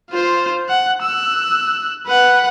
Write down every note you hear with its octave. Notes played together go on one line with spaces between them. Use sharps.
F4 C5
F#5
E6 F#6
B4 F#5